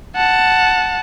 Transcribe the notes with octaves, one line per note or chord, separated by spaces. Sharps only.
F#5 A5